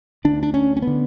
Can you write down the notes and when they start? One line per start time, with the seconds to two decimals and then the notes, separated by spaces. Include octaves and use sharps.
0.25 D2 D3 D4
0.43 D4
0.54 C#4
0.77 C#4
0.82 D3 B3